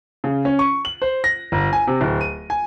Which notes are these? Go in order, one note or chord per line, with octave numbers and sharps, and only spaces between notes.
C#3
C#4
C#6
F#7
C5
A#6
G1
G#5
C3
D1
D#7
G#5